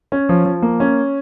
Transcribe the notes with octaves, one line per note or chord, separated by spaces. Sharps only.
C#4
F3
F3
A#3
C#4